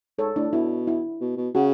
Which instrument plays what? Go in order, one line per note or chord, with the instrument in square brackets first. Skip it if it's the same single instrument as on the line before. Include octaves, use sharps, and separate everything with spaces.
[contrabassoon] G#2 [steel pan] A4 C#5
[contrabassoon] A2 [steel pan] D4
[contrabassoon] B2 [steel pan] E4
[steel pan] E4
[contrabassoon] B2
B2
[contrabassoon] C#3 [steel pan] F#4